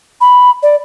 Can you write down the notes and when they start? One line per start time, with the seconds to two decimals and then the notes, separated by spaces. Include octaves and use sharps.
0.21 B5
0.63 D5